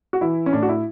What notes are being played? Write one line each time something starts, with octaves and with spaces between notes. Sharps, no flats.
F#4
E3 E4
C#4
A2 D4
F#4
E4